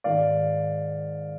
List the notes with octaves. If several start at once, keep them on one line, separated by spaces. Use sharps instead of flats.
G#2 D#3 G#3 D5 F5